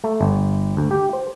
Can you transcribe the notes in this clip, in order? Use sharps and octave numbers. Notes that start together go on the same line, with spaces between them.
A3
G1
D2
G4
C5